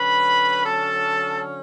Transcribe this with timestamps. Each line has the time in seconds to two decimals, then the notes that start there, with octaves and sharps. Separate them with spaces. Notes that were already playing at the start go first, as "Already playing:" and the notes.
Already playing: D3 F#3 C#4 B4 B5
0.65 A4 A5